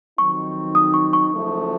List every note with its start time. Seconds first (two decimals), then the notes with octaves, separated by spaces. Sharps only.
0.18 F2 D#3 F#3 C4 D#4 C#6
0.75 D#6
0.94 C#6
1.13 C#6
1.32 F#1 F#2 F3 A3